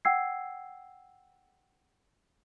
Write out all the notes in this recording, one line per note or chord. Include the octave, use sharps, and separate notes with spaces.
F#5 G5 E6 G#6 C7